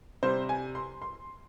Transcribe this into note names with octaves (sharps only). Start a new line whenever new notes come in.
C3 G3 C5
G#5
C6
C6